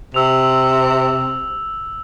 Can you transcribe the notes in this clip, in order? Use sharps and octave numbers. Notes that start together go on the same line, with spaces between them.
C3 E6 F7